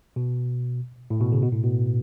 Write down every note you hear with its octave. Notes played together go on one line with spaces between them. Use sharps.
B2
A2
B2
C#3
B2
A2
B2